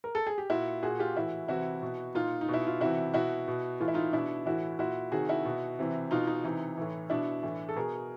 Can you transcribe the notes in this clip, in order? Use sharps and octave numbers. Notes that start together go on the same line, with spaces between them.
A#4
A4
G#4
G4
A#2 E4 F#4
A#2 F#4 G#4
F4 G4
A2 E3 E4 F#4
C3 E3 E4 F#4
B2
A#2 D#4 F4
D#4
B2
E4
F4
C3 E3 E4 F#4
B2 E4 F#4
B2
A2 E3 F4
E4
D#4 F4
B2 D4 E4
A2 E3 E4 F#4
A#2 E4 F#4
C3 D#3 F#4 G#4
E4 F#4
B2
C3 E3
B2 D#4 F4
D#4
C3 E3 D#4
A2 E3
B2 D4 E4
A2 E3
A4
B2 G#4 A#4